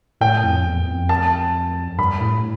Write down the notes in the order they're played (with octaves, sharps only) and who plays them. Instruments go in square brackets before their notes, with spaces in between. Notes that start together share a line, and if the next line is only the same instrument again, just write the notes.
[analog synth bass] A2 [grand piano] G5
[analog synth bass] F2
E2
F2
[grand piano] A5
[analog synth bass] G2 [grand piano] B5
[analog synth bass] A2